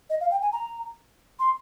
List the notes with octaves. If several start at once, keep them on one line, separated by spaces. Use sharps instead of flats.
D#5
F5
G5
G#5
A#5
C6